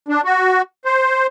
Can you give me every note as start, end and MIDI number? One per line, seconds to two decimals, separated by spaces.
0.08 0.21 62
0.24 0.62 66
0.85 1.27 72